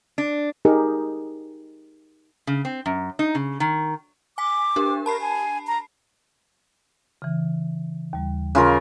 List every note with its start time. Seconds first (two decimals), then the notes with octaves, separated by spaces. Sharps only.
0.18 D4
0.65 D#4 G4 G#4 A#4
2.47 C#3
2.65 C4
2.86 F#2
3.19 D#4
3.35 C#3
3.60 D#3
4.38 G#5 D6 B6
4.76 D4 G4 A#4
5.06 A#4 A5 B5 C7
5.21 G#5
5.67 A#5
7.22 C#3 E3
8.13 D#2 G3
8.55 C#3 F4 A#4